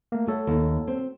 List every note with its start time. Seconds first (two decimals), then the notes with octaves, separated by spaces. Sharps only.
0.12 A3 A#3
0.28 A3 F#4 A4 C#5
0.47 D#2
0.87 C4